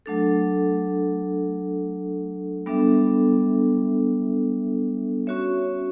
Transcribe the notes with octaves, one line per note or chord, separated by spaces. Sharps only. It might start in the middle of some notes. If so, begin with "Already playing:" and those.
F#3 A3 D4 A4
G3 B3 D4 A4 E5
C#4 F#4 C#5 E5